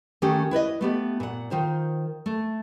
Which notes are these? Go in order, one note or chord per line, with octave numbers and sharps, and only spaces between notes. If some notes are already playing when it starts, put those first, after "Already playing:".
D#3 A3 C#4 G4
E4 B4 D5 D#5
A3 B3 G4
A#2 F#5
D#3 F4 C5
A3